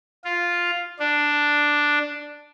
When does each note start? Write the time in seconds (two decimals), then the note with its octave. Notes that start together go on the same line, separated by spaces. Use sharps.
0.24 F4
1.00 D4